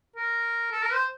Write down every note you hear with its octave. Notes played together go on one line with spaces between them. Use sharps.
A#4
A4
A#4
C5